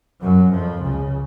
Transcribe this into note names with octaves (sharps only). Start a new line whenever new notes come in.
F#2 F#3
F2 F3
C#2 C#3